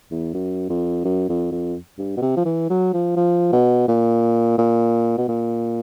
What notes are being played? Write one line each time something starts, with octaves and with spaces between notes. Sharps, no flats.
E2
F#2
F2
F#2
F2
F2
G2
B2
C3
F3
E3
F#3
F3
F3
B2
A#2
A#2
B2
A#2